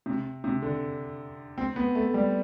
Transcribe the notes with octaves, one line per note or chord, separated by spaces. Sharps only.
C3
C3
D3
C4
B3
A3
G3